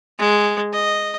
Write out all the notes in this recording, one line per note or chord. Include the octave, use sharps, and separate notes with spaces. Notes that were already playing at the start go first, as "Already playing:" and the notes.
G#3
D#5